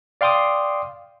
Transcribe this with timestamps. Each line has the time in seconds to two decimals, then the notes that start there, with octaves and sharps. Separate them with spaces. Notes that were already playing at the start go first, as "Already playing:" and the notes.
0.21 D5 F5 G5 C6 D6 D#6